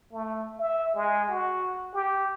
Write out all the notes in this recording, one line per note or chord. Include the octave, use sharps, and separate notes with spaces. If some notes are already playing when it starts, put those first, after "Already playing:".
A3
E5
G#3
F#4
G4